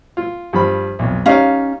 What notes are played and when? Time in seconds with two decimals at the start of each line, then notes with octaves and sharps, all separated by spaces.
0.17 F4
0.53 G2 F3 B5
0.99 B1 F2
1.26 G3 C#4 D#4 F5